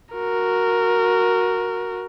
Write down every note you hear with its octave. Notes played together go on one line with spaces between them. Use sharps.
F#4 A#4